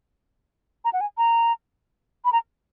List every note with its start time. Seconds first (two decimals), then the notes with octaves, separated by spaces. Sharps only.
0.85 A#5
0.93 F#5
1.01 G#5
1.18 A#5
2.25 B5
2.33 A#5